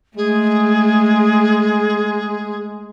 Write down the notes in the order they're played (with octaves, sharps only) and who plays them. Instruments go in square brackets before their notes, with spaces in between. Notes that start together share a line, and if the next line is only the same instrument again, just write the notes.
[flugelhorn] G#3 [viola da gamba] A3 [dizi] G#4